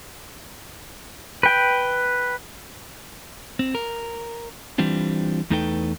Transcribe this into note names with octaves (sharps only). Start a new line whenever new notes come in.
B4 G5
C4
A#4
E3 G3 C4 D4 F4
E2 A3 D#4 A4 B4 G5